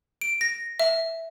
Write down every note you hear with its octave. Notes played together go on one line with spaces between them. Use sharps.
D7
A#6
E5